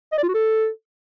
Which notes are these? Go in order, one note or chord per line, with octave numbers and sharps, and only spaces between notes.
D#5
D5
F4
F#4
A4